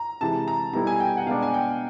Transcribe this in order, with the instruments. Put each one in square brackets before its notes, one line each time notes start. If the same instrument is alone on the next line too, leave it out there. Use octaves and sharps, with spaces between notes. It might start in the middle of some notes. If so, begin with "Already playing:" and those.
Already playing: [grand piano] A#5
[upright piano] C3 E3 G#3 [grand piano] A5
[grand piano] A#5
[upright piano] B2 G3 B3 E4 A4 [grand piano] A#5
[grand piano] G#5
G5
F#5
[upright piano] B2 G#3 B3 D4 [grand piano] F5
[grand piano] G#5
G5